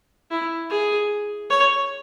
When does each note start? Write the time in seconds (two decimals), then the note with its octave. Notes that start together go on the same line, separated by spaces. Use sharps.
0.31 E4
0.70 G#4
1.50 C#5